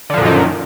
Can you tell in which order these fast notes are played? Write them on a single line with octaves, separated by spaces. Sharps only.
D3 F3 A#2 F#2 D#3